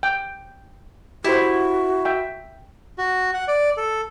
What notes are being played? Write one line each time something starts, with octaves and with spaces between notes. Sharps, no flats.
G5
E4 F#4 G4 C5
E5 G5
F#4
F#5
D5
A4